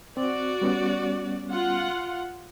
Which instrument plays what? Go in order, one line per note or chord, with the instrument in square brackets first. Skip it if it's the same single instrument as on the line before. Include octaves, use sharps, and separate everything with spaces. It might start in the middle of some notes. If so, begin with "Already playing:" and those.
[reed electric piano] C4 [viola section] F#4 D5
[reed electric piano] G3 B3 C#4
[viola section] F4 F#5